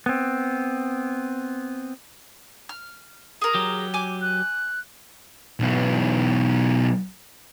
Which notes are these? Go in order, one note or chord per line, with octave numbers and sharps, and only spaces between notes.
B3 C4
F6
G#4 A#4
F#3 G4
G#5 D6
F#6
B1 E3